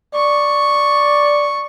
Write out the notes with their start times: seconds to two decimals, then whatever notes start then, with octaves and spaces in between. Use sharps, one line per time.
0.15 D5 C#6